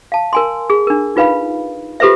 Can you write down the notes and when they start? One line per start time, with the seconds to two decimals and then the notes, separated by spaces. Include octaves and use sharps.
0.12 F5 A5
0.33 A#4 G#5 C6
0.70 G#4
0.87 D4 A#4
1.16 D#4 F4 B4 F5 B5
2.00 F4 G4 A4 B4 C5 E5